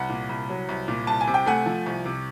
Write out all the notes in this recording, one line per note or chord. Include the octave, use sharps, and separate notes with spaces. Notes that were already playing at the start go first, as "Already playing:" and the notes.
Already playing: C2 F#5
A#2
C2
F#3
C2
A#2
C2 A5
G#5
C3
G5
A3 F#5 G#5
F3
C2
C3